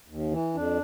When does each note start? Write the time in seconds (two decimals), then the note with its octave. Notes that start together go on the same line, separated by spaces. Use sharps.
0.08 D#2
0.31 E3
0.54 F2 D4